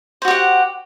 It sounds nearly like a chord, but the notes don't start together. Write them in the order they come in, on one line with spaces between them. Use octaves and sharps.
C5 F#4 G4 F#5